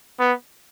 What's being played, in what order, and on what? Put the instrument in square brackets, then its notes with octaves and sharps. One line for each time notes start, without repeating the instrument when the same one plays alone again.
[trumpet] B3